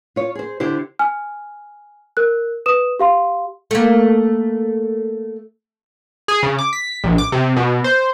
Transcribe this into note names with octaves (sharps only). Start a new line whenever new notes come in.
F4 C#5
G#4 C5
D3 E4 G4 C5
G#5 F6
A#4 F#6
B4 D#6 E7
G4 F5 C6
A3 A#3
G#4
C#3
D6
B6
A#1
D6
C3
B2
C5